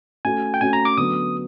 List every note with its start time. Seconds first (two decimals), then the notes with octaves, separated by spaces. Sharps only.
0.25 A3 C#4 F#4 G#5
0.54 G5
0.61 A3 C#4 F#4 G#5
0.73 A#5
0.85 D6
0.97 D3 F#3 B3 D#6